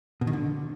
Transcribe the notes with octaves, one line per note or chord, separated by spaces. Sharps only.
B2
D#3
D3